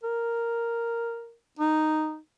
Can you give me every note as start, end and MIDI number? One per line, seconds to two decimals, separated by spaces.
0.03 1.34 70
1.59 2.18 63